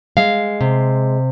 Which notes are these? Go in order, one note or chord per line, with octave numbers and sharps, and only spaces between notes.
G#3 F5
C3